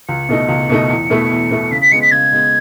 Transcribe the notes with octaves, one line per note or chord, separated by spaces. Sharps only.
C#2 C#7
B2 A3 D#4
C#2
B2 A3 D#4
E2
B2 A3 E4
E2
B2 A3 E4
C#3 B6
B6
G#3 B3 C#7
B6
C#3 G#6
G#3 B3